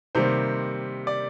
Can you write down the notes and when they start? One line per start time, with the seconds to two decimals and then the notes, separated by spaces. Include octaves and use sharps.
0.15 C3 D#3 G3 A#3 C5
1.07 D5